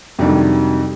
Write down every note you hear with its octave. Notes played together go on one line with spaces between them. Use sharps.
F2 C3 D#3 F#3 G3 D4